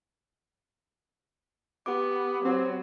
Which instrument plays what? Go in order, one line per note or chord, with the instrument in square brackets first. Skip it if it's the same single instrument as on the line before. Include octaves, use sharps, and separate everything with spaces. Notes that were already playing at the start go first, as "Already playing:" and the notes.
[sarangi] B3 [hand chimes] G4 D6
[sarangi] F#3 [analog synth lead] C4